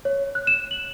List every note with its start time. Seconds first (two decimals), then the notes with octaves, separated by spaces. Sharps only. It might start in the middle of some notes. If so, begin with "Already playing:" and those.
0.05 C#5
0.35 F#6
0.47 E7
0.71 F#7